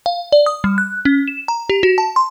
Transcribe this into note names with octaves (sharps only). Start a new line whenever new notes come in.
F5
D5
D#6
G3
F#6
C#4
E7
A#5
G4
F#4
A5
C6